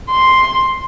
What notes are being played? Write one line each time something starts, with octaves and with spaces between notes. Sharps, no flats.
C6